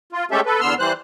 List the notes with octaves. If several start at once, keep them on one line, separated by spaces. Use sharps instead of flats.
F4
G#3 A3 C#4 G4 A4 E5
A4 B4
E2 D3 B3 C6 E6 F6
E3 G3 C5 F#6